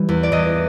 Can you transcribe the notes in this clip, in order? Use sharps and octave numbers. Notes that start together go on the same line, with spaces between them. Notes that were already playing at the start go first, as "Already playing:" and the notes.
Already playing: E3 G3
E2
D5
E2 D#5